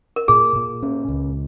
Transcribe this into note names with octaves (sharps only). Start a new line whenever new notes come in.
A#4
A#2 G#4
A#2
C#4
C#2